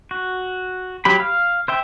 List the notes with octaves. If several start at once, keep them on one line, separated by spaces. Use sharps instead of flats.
F#4
F#3 G4 B5
F5
C5 E5 G5